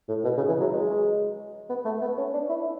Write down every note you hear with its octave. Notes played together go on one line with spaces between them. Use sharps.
A2
B2
C#3
E3
F#3
G#3
B3
A3
B3
C#4
D4
E4